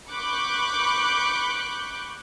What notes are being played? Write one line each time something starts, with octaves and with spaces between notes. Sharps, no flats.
B5 C#6 D6 F#6 G6